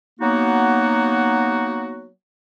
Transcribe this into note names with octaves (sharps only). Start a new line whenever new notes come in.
F#3 A#3 B3 D#4 F#4